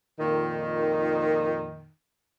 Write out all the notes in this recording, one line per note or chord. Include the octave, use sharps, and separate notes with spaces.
F2 A#2 D#3